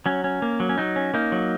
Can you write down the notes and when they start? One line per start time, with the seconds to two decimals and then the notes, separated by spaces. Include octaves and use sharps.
0.06 F#3 C#4
0.24 C#4
0.42 A#3
0.60 F#3
0.69 C#4
0.78 F#3 D#4
0.96 C#4
1.14 A#3 D#4
1.32 F#3